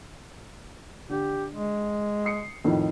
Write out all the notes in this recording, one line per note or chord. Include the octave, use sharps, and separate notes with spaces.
D3 G4
G#3
D#6 C7 C#7
F2 A2 D#3